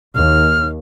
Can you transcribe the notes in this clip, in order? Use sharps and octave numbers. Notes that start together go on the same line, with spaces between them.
D#2 F6